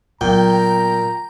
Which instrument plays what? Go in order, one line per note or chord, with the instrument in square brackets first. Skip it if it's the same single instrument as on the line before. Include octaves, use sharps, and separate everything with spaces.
[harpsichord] A#2 [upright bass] F#3 B3 [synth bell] G5 [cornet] A#5